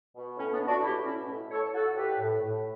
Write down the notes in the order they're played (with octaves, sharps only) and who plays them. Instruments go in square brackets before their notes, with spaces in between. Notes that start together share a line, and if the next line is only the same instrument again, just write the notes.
[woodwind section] B2
A2 C#4
B3 D4
A2
D4 F#4
B2 E4 G4
B2 C#4 E4
A2
A2 A4 C#5
A2 F#4 A4
A2 G4 B4
A2
A2